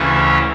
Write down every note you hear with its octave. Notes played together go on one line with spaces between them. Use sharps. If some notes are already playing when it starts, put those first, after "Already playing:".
Already playing: D2 C#3 E3 A3 C#4